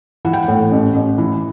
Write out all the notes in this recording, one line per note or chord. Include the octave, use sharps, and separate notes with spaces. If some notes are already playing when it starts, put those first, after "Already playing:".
E3 F#5
G5
F#5
A2
A1
A1
E3